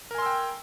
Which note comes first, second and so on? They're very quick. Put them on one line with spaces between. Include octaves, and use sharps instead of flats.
A#4 G#5 C6 E6 G5